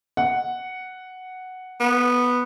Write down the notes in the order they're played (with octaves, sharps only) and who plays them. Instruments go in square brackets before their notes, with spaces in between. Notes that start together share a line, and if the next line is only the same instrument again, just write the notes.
[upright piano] F#5
[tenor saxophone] B3